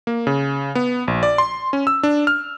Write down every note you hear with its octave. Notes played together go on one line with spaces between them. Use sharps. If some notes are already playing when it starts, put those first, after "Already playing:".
A#3
C#3
B3
A#1
D5
C6
C#4
E6
D4
F6